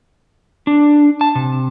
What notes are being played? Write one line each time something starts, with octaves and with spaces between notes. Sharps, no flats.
D4
A5
C3